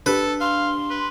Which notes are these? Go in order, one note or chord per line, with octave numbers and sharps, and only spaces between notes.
D4 G4 A4 B4
F5 C6
B4